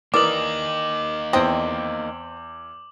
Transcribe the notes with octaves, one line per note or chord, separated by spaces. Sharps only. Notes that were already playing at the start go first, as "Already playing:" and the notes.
E3 A#3 D#4 A#4 D5 D6 D#6 F#7
E2 C4 D#5 G5